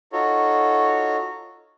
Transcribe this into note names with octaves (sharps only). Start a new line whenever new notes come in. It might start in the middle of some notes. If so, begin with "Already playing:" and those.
D#4 F4 F#4 A4 C#5